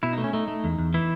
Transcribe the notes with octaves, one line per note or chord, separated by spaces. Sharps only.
B2 E4
A3 D#4
C#4
A3 D#4
A3
E2
E2
E3 E4